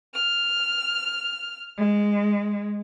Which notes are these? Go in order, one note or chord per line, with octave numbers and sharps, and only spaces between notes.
F6
G#3